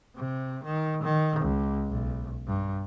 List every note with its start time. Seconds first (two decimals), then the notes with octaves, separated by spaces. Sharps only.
0.17 C3
0.65 D#3
1.03 D#3
1.40 C#2
1.90 B1
2.48 G2